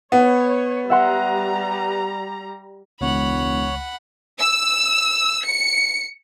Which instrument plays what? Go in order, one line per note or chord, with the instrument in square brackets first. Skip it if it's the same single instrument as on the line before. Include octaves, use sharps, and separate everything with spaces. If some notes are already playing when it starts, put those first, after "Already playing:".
[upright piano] B3 [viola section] C#5
[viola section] G3 A#5 [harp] E5 F#5 C6
[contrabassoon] E1 [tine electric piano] C#2 [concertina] C#5 [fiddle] F#5 B5
[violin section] E6
C#7